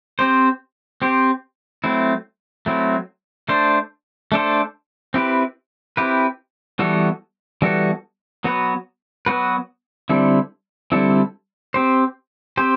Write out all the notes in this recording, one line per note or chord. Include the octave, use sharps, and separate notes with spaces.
C4 G4 C5
C4 G4 C5
F#3 A3 C4 E4
F#3 A3 C4 E4
A3 D4 A4 C5
A3 D4 A4 C5
C4 E4 G4 B4
C4 E4 G4 B4
E3 G3 B3 F#4 A4
E3 G3 B3 F#4 A4
F#3 B3 F#4 B4
F#3 B3 F#4 B4
D3 G3 C4 E4 A4
D3 G3 C4 E4 A4
C4 G4 C5
C4 G4 C5